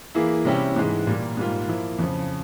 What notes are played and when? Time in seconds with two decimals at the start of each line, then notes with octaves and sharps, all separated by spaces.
0.15 E3 A#3 E4 G#4
0.45 C3 G3 C#4 E4 G4
0.76 G#2 E3 G#3
1.07 A#2 G3 A#3
1.37 G#2 G3 A#3 F4
1.68 F3 A#3 E4
1.99 F2 C#3 F3